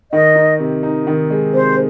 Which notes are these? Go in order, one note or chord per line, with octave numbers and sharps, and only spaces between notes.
D#3 D#5
D#4
C3
D#4
D#3
G#3
C3 C5